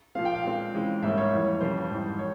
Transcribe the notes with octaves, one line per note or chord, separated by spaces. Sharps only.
A#2 F3 C4 F5
G5
F5
A#2 G#3 C4
C#3 E3 G#3
G#2 G3 A#3 C#4 E5
C#5
F2 E3 G3
F2 C#3 G3 C5
G#2 E3 G3
C#5